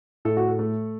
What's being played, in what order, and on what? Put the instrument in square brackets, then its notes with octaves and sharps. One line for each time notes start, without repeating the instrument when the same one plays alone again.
[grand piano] A2 A4
F#4
A4
A3